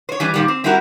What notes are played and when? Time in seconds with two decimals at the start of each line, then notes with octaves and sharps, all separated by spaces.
0.09 C5 C#5
0.20 E3 G3 C#4
0.34 A#2 D#3 G3
0.48 C4
0.64 G3 C4 E4 F#4 G4 A#4